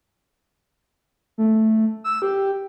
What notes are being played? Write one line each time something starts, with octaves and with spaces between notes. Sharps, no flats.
A3
E6
G4